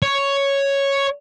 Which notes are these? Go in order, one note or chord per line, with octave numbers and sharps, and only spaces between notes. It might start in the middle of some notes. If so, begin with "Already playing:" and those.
C#5